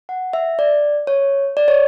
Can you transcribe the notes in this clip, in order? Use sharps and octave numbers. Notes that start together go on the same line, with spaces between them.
F#5
E5
D5
C#5
D5
C#5